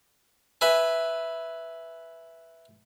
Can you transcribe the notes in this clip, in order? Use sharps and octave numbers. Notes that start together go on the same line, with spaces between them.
B4 E5 G#5